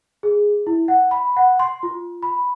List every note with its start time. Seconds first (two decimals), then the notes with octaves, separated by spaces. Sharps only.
0.23 G#4
0.67 E4
0.88 F#5
1.11 B5
1.37 F#5
1.59 C6
1.83 F4
2.23 B5